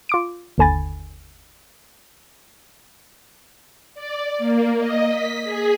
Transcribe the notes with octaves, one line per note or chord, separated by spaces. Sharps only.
F4 D6 D7
G1 D#2 D3 G#5 B5 A6
D5
A#3
D#5
B6
G#4